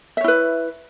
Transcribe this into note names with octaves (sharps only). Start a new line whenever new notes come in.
E4 B4 C#5 E5